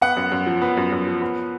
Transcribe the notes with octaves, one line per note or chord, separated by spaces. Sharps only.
B3 F#5
F#2
F#2
F3
B3
F#2
F#2
F3
B3